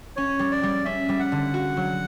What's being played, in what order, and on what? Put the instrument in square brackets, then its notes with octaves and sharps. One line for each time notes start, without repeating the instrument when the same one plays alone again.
[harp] C#4 [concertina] C#5
[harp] G3
[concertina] D5
[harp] G3
[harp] C#4 [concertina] E5
[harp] G3
[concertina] F#5
[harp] D3
F#4
F#3